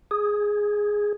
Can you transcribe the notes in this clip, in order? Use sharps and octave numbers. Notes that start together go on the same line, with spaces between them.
G#4